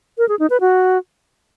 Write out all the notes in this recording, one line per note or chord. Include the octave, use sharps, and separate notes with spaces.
A#4
G#4
D#4
B4
F#4